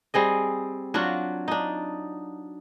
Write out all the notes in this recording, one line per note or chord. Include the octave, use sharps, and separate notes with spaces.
G3 C4 G#4 D#5
F#3 D4 F4 F#4
D4 D#4